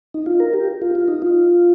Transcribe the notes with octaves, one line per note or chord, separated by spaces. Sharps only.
D#4
F4
A#4
G4
F4
F4
D#4
F4